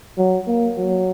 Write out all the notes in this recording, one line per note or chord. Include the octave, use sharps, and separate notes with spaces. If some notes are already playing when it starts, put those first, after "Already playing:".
F#3
A#3
F#3